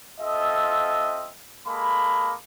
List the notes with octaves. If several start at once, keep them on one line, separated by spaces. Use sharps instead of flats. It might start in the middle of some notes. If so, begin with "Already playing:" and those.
C4 F4 A4 D#5 E5
G#3 A#3 A4 B5